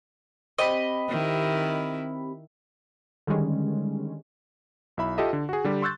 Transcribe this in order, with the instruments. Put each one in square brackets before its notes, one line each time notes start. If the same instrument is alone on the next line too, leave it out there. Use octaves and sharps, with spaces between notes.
[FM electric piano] C4 G4 B5 [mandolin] D#5
[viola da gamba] D#3 E4
[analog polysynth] D3 D#3 G3 G#3 C#4
[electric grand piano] B1 E4 E5 B5
F4 G4 A4 D#5 E5
D3
F#4 G#4
D3 G3 G4
C6 C#6 E6 F#6 G6 A6